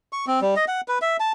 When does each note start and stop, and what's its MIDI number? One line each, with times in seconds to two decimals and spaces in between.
0.13 0.25 85
0.27 0.40 60
0.42 0.54 55
0.56 0.65 75
0.68 0.81 78
0.88 0.99 71
1.02 1.17 76
1.20 1.32 81